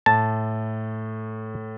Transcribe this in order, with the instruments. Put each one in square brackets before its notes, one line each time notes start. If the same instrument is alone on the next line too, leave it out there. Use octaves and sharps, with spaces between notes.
[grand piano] A2 [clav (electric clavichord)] A5